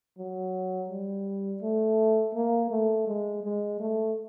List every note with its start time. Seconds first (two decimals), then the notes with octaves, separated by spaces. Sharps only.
0.18 F#3
0.89 G3
1.62 A3
2.35 A#3
2.71 A3
3.07 G#3
3.44 G#3
3.80 A3